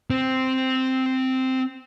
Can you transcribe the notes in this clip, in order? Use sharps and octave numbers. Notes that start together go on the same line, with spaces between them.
C4